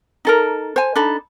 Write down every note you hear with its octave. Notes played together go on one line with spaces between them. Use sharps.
D#4 A4 A#4
C5 G#5
D4 D#4 A4 B5